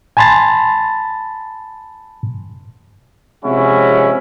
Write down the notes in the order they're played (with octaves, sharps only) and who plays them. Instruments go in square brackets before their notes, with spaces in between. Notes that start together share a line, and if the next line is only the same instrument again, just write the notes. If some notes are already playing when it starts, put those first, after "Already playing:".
[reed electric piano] G#5 A5 B5 C6 A6
[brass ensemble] C3 F3 G#3 C#4 E4 F#4